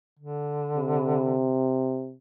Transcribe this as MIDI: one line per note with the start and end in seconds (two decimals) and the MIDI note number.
0.19 1.56 50
0.75 2.14 48